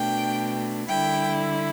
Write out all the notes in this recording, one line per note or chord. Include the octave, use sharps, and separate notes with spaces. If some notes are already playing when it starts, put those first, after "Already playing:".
Already playing: B2 A3 D4 G5
D3 G3 E4 G5